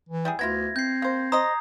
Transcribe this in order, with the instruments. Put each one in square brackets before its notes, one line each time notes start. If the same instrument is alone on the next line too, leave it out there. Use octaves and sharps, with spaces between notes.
[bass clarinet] E3
[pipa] G3 E4 G#4
[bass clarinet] D2 [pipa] B3 E4 F4 [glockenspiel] G#6 A#6
[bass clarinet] C4 [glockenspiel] G6 C7
[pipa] A#3 C5
[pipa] C5 D#5 [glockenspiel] A#5 D#6